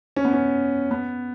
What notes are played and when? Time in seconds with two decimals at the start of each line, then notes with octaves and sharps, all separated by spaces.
0.16 C#4
0.25 B3
0.33 C#4
0.91 B3